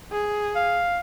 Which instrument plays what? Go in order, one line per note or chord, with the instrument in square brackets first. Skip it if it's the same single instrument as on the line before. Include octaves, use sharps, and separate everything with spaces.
[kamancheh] G#4
[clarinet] F5